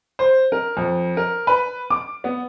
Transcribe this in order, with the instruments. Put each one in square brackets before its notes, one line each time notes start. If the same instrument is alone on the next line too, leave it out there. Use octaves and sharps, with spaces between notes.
[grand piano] C5
A#4
F2
A#4
B4
D6
B3